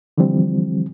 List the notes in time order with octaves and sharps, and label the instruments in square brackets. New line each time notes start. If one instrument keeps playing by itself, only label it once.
[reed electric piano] D3 E3 F3 G3 C4